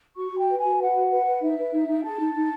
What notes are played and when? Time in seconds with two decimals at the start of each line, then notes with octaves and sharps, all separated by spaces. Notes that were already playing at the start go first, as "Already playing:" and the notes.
0.16 F#4 C#6
0.31 F#4
0.37 G5
0.47 B4
0.57 G#5
0.63 F#4
0.78 B4 F#5
0.95 F#4
1.10 B4
1.26 B4
1.41 D#4 E5
1.57 B4
1.72 D#4
1.88 D#4
2.04 G#4 A5
2.19 D#4
2.34 D#4